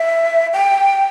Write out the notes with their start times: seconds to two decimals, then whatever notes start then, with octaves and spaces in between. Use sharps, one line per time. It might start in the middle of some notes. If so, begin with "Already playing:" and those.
Already playing: E5
0.53 G5